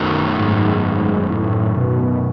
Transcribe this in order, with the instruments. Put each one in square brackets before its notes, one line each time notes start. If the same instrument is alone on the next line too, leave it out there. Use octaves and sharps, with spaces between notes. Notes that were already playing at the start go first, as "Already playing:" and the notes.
Already playing: [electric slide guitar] F#2 D#3 F#3 A3
[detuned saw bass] G#2
A2
B2